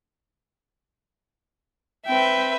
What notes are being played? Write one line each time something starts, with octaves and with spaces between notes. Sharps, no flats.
C4 B4 E5 G5